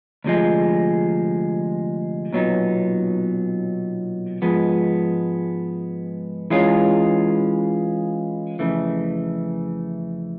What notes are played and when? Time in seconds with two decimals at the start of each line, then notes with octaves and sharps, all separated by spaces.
0.24 D2 C3 F3 G#3
2.33 B1 A#2 F#3 B3 D#4
4.42 G#2 F3 G#3 B3
6.50 E3 G#3 C#4 F4
8.59 F2 C#3 E3 A3